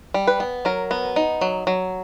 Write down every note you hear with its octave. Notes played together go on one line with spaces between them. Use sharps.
G3
B4
B3
F#3 A#4
B3
D#4
F#3
F#3